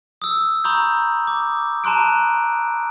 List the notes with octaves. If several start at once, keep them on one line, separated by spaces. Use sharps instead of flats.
D#6 E6
A#5 B5 C#6 D#6 G6
D6
A5 A#5 C6 F#6 D7